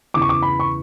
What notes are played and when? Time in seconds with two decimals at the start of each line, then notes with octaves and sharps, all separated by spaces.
0.14 E2 C#3 E3 D6
0.22 C#6
0.29 D6
0.42 B5
0.60 C#6